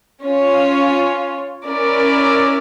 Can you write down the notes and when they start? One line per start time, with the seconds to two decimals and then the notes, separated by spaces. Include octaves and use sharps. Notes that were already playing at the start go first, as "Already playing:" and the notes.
0.23 C#4 F4 C#5
1.65 C#4 E4 A#4 D5